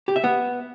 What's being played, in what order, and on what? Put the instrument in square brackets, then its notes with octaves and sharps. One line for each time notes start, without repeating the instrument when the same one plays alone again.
[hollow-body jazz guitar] G4
E5
B3